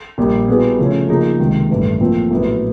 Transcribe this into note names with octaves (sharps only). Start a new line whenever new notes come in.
A#1 A#2 G3
B2 G3 B3 E4 G#4
C#3 F3 A3 C#4
C#3 F3 A#3 D#4 G#4
C#2 C3 D#3
A1 G2 E3 A3
A#2 F3 A3 C4
A#1 A2 F#3 B3 E4